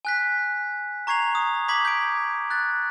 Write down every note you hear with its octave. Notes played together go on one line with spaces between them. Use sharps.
G#5 F#6 B6
A#5 C#6 G#6 C7 F7
D#6
B5 D6 D#6 G#6 B6 F#7
G6 D7
F#6 A6